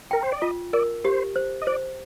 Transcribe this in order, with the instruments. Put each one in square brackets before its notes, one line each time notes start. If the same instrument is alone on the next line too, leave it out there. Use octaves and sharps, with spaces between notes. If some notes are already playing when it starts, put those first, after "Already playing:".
[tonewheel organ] A#4 [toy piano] G5
[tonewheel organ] C5
D5
[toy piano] F4 [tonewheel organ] D#5
[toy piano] A#4 [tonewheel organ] D5
[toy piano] G4 [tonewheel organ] C5
[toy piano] C5
[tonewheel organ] D#5
[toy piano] C5 [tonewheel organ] D5